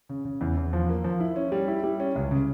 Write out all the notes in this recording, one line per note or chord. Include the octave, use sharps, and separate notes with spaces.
C#3
C#3
E2
E2
F3
A#3
F3
E4
C#4
G3
E4
G3
C#4
C#2
C#3